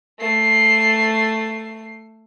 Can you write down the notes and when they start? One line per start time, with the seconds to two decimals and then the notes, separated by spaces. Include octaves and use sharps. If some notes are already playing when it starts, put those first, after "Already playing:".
0.18 A3 C7